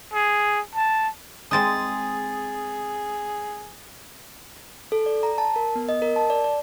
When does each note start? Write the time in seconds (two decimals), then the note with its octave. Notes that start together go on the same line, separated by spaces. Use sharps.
0.13 G#4
0.75 A5
1.51 G#3 C4 D#4 G#4 D#6 A6
4.92 A4
5.06 D5
5.23 A#5
5.38 A5
5.56 A#4
5.75 B3
5.89 D#5
6.02 A#4
6.16 A5
6.30 D5
6.44 D5